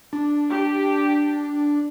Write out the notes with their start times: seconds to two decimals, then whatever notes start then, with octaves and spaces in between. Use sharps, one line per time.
0.13 D4
0.51 G4